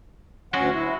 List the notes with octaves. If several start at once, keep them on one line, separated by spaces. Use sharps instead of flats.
D2 F#3 G#3 C#4 F#4 F#5
E4